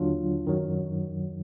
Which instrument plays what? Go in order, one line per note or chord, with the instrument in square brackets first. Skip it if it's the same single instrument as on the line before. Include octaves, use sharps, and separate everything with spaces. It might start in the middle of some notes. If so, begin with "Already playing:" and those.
Already playing: [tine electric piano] D#2 D3 F#3 D4 F4
F#2 D#3 F#3